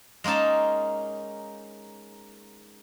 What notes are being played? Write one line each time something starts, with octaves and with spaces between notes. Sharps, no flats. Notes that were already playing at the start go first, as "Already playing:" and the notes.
G#3 A#3 C#4 D#4 A5